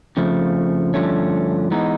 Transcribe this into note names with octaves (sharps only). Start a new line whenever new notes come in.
F2 C#3 F3 A3
G2 D3 F3 A3 C#4
E3 G#3 B3 D#4